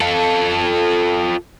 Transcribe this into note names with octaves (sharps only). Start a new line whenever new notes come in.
F4 A4